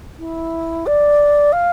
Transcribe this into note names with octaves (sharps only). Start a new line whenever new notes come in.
E4
D5
F5